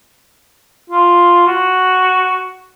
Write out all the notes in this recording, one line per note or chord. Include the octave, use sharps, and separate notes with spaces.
F4
F#4